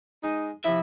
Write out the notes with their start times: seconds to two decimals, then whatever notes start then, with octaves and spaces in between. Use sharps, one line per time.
0.24 G#3 D#4
0.65 C3 F3 E4 E5